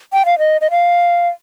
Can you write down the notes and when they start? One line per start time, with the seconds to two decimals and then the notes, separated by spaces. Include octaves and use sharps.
0.13 G5
0.26 F5
0.39 D#5
0.61 D#5
0.71 F5